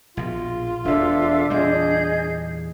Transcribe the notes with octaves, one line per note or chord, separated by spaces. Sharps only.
A#1 B2 F4
E1 E2 D4 A4 E5 F5
E2 A#2 G3 G#4 D#5 G6